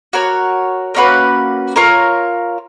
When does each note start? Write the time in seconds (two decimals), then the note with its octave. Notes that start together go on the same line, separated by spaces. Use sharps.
0.13 F#4 A#4 C#5
0.95 A#3 C#4 F#4 B4
1.76 F4 A#4 C#5